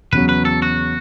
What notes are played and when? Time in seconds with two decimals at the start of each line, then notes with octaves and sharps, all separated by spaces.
0.12 E2 C#3 F#3 B4
0.29 B4
0.45 A4
0.62 F#4